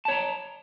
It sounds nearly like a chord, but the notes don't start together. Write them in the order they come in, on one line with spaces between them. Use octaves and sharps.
A5 C#5 A#5